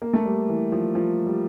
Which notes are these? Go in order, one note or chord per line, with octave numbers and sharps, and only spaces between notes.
A#3
A3
G3
E3
F3
F3
G3